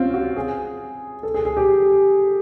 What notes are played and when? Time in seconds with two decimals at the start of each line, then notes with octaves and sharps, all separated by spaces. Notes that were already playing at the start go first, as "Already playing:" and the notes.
Already playing: C4 C#4 F4
0.14 F#4
0.36 G#4
1.23 A4
1.34 G#4
1.45 G#4
1.57 G4